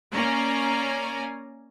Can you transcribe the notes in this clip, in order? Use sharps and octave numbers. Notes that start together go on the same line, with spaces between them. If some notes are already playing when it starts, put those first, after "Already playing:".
A#3 C#4 C#5 D5 G#5 A#5